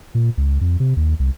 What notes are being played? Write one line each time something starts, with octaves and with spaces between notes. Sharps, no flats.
A#2
C#2
F2
C3
D#2
C2